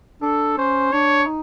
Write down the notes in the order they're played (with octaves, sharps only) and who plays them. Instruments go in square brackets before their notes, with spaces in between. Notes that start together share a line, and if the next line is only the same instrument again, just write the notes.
[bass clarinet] D4 [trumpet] A4
[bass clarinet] C#4 [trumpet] C5
[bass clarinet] D4 [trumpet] C#5
[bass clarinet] D#4